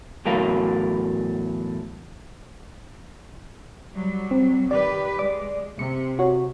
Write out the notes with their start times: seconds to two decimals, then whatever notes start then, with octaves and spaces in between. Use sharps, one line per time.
0.26 E2 A2 F#3 A3 A#4 F5
3.93 F#3 G3
4.31 C4
4.71 D#3 G4 B4 D5
5.19 G#3 D5 D6
5.79 C3 C#7
6.19 F#4 C#5